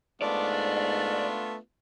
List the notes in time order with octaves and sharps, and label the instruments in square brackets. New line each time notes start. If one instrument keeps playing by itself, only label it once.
[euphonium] G#2 [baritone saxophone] A3 [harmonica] B3 D4 F4 [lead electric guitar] D5